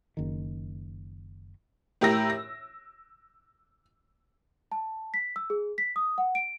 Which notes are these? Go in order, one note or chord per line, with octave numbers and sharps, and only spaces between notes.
F#1 D#3
A2 G4 A#4 E6 A#6
A#6
A5
B6
E6
G#4
B6
D#6
F#5
D7